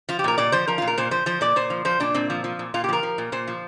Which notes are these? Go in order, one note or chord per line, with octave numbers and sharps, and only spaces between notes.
F3 F4
G4
A#2 A#4
A#2 D5
F3 C5
F3 A#4
F4
A#2
A#4
A#2 C5
F3 C5
F3 C5
A#2 D5
A#2 C5
F3
F3 C5
A#2 D4
A#2 C4
F3
F3
A#2
A#2 F4
G4
F3 A#4
F3
A#2
A#2 C5
F3